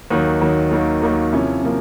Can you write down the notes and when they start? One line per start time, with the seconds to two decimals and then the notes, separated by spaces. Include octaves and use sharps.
0.10 D#2 D#3 F#3
0.41 D#2 D#3 F#3
0.71 D#2 D#3 F#3 A#3
1.02 D#2 D#3 F#3 A#3
1.33 C3 F3 A#3 C#4 E4
1.63 C3 F3 A#3